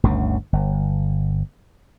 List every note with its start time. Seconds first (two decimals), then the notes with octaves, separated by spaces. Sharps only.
0.03 G1 D2 C#3
0.53 G1